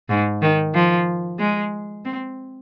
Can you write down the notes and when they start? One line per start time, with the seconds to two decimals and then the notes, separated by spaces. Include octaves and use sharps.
0.10 G#2
0.42 D#3
0.75 F3
1.39 G#3
2.05 C4